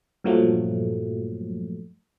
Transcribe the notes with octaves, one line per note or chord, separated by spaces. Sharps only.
G2 A#2 F3 F#3 A3